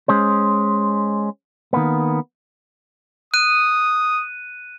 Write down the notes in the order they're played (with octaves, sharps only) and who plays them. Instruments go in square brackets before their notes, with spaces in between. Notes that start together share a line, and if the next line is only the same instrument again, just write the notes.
[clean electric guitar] G#3 C#4 C5
D#3 A#3 B3
[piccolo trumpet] D#6 [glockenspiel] F#6 D#7